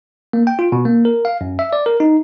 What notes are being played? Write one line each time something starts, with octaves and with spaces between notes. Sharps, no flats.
A#3
G5
F4
B2
A#3
A#4
F5
F#2
E5
D5
A#4
D#4